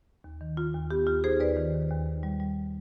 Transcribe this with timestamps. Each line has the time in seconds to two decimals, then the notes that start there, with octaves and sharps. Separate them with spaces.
0.24 D#2
0.41 D#3
0.57 D#3 F4
0.74 D#2
0.91 B3 G4
1.07 D#2 F4
1.24 D#4 G#4 C5
1.40 D#2 B4 D5
1.57 D#3
1.74 D#2
1.90 D#2
2.06 D#2
2.23 G3
2.40 G3